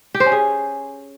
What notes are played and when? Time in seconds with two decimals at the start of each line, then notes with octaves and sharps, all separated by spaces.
0.14 G4
0.20 C5
0.26 C#4
0.32 G#4